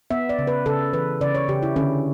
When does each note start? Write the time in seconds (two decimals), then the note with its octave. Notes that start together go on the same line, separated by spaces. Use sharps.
0.11 B3 E5
0.29 D5
0.39 C#3
0.47 B4
0.66 C#3 A4
0.93 E3 B4
1.21 C#3 D5
1.35 C#5
1.48 C#3 G4
1.63 E4
1.76 D3 C#4